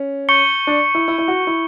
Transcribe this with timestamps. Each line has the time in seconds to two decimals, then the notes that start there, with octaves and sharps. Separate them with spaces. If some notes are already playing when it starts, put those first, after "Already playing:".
Already playing: C#4
0.29 C#6 G6 C#7 G7
0.67 D4
0.95 E4
1.08 E4
1.18 E4
1.28 F#4
1.47 E4